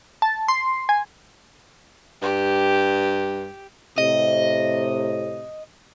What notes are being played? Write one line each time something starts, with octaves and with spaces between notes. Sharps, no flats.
A5
C6
G#5
G2 G4
A2 C3 D#5